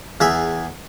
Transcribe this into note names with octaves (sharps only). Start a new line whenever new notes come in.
E2 G#4 E5